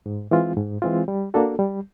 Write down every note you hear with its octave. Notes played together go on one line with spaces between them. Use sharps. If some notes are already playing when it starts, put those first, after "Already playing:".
G#2
E3 G#3 C4 F4
G#2
E3 G#3 C4 F4
G3
A#3 D4 F#4 A4
G3